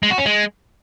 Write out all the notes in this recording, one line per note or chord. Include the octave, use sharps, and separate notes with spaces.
G#3
F#4
C#4
G#3